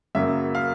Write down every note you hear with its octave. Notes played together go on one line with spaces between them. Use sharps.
F#2 C#3 F#3 A#3 E5
F5